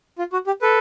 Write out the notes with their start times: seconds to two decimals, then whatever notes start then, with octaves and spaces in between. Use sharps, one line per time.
0.18 F4
0.33 F#4
0.47 G4
0.61 A4 B4